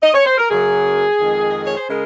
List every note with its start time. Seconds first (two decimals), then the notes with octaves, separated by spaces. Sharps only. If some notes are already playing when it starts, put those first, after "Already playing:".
0.02 D#5
0.13 C#5
0.25 C5
0.37 A#4
0.50 F#2 C#3 F#3 A#3 G#4
1.19 F2 D#3 G#3
1.51 D#5
1.64 C#5
1.76 C5
1.88 C#3 G#3 A#4